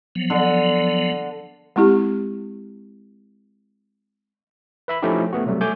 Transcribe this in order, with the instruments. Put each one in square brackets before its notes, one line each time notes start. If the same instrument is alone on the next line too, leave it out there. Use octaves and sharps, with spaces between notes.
[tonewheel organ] F3 F#3 B3
[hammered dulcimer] D3
[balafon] G#3 C4 E4 G4
[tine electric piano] B4 E5 B5
F3 A3 C#4 D#4 E4 G4
A3 B3 F#4
C3 F#3 G3 A3
A3 G#5 D6 G6